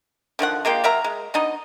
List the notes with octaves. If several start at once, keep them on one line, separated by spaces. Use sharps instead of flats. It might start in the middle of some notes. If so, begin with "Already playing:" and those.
D3 D#3 F3 F#5
G#3 A#3 F4 G4
F#3 A#4 E5 A#5
G#3
B2 D4 D#4 D#5